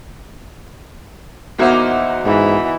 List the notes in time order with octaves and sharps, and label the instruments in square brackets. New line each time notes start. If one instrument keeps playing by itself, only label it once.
[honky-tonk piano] E2 F#4 E5 [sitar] A#3 D#4 C5
[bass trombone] G#2 [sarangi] E3